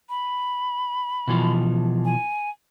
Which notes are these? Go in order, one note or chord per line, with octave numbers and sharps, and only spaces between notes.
B5
B2 E3 F3
G#5